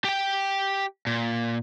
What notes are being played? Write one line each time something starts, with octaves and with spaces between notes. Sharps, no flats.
G4 G5
A#2